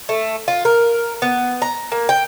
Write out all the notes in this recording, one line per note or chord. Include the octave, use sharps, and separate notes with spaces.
A3
F4
A#4
B3
A#5
A#3
G5